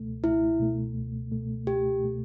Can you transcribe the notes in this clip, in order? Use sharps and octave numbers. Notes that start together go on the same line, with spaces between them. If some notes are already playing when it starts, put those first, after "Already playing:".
Already playing: C#2 B2 A3
C#2 E4
B2 A3
C#2
B2 A3
C#2 G4
B2 A3